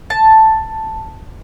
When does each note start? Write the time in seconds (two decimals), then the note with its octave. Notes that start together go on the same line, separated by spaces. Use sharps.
0.10 A5